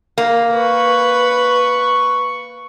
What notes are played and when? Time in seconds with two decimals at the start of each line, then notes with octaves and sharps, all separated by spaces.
0.18 A#3
0.53 B4 C#6